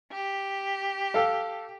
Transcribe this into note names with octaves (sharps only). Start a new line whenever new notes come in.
G4
A4 F5